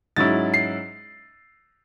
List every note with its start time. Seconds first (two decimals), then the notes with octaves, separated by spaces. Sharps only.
0.16 G#2 F#3 C#4 E4 A6
0.54 C7